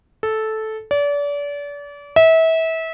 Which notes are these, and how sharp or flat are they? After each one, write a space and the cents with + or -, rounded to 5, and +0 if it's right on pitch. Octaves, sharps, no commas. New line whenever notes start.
A4 -10
D5 -35
E5 -30